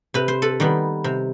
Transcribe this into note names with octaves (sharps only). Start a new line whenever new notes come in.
C3 B4
C5
A4 B4
D#3 G3 B3
C3